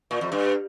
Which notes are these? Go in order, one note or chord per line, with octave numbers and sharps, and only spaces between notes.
A#2
F2
G2